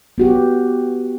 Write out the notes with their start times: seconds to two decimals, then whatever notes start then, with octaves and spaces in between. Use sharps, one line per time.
0.18 B3 F#4 G4